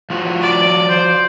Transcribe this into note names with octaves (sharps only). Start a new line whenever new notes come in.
F3 F4 F#4
D5
C5